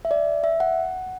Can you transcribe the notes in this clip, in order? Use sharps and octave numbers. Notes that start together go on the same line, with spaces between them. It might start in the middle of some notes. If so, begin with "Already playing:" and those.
E5
D5
E5
F#5